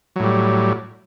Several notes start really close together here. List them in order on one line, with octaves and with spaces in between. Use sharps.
F#3 A2 G3